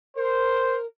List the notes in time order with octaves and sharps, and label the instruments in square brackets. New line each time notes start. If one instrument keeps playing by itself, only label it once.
[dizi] A#4 [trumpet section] C5